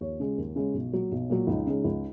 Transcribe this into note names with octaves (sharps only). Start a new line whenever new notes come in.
D#2 C#5
C#3 G#3
D#2
C#3 G#3
B1
A#2 F#3
B1
A#2 F#3
C#2 D#4
C#3 G#3
C#2